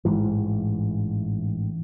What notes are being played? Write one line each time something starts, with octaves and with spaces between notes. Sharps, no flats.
A1 G#2 E3